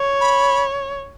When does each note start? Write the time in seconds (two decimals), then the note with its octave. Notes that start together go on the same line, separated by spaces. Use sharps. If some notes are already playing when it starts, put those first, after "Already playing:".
Already playing: C#5
0.21 B5